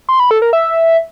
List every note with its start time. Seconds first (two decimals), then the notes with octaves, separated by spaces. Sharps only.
0.09 C6
0.20 B5
0.31 A4
0.42 A#4
0.53 E5